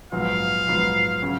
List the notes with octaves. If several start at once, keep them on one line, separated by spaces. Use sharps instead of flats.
A#1 G#2 F#3 B3 F4 F5
A#1 G#2 F#3 B3 F4
C#3 F#3 C#4